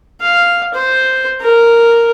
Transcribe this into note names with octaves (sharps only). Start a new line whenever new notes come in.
F5
C5
A#4